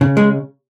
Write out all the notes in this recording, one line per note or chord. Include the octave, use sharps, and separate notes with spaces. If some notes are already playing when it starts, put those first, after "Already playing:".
C#3
G#3